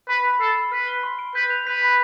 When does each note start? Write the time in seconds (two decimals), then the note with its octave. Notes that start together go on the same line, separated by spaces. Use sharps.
0.08 B4 B5
0.24 B5
0.40 A4 C7
0.56 C7
0.72 B4 F6
0.87 G7
1.03 C6
1.19 D7
1.35 B4 G6
1.50 F7
1.67 B4 B6
1.82 B5